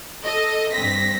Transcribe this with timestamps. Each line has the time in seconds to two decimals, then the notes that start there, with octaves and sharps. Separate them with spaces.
0.24 A4 D#5
0.73 G2 C4 A#6 B6